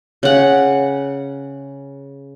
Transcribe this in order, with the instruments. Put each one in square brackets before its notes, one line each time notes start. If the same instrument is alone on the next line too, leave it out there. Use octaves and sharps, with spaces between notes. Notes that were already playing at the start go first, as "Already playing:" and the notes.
[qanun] C#3 F#5